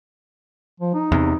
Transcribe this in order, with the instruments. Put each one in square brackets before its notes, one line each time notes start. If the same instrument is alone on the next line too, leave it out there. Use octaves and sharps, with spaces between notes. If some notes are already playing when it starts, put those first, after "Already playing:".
[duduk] F3
D#4
[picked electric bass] E2 C3